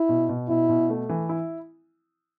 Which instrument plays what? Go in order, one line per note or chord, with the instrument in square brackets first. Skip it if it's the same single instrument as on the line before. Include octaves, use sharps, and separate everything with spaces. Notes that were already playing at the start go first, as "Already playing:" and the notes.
Already playing: [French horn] E4
[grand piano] B2
B2
[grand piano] B2 [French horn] E4
[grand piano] B2
A3
E3
E4